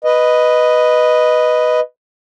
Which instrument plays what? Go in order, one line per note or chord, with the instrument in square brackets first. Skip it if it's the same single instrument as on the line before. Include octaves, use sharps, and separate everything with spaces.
[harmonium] B4 D#5